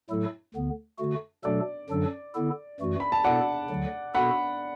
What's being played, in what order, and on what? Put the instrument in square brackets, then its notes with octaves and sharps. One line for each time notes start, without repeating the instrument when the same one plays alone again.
[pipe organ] A2 F#3 A3 E4 A4
D2 D3 B3
D3 A3 F#4
[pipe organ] B2 F#3 A3 D4 A4 [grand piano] D5
[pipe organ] F#2 D3 F#3 D4 A4
D3 B3 E4 A4
F#2 E3 A3 F#4
[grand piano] B5
A5
[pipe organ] B2 B3 E4 A4 [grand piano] D5 F#5
[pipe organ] D2 D3 F#3
[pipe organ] B2 B3 F#4 A4 [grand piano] F#5 B5